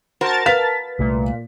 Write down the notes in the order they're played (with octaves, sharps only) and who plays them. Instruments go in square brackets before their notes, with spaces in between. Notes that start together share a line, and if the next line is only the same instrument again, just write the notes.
[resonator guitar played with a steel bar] F#4 C5 [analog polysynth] A#4 A5 A6
[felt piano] B4 B6 [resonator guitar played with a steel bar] F5
[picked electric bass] C2 A3 [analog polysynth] A#2